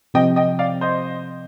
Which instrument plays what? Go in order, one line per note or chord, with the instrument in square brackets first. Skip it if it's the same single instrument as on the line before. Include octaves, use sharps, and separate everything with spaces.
[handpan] C3 F3 C4 [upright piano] D#5 G5
[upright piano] D#5 G5
D5 F5
C5 D#5